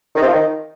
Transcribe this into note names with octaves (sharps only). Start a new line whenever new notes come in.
D#3
C3
F3
D#3